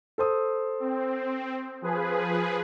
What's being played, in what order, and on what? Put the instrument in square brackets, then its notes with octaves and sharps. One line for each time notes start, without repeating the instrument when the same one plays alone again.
[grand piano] A4 C5 D#6
[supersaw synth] C4
F3 G#4 B4